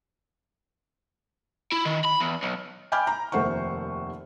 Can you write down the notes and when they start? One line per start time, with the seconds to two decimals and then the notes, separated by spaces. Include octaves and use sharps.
1.72 E4
1.85 D#3
2.04 B5
2.20 E2
2.43 B1
2.92 G5 G#5 B5 D6 F6 G6
3.07 A#5
3.32 F1 D#2 A3 C5 F#5 C#6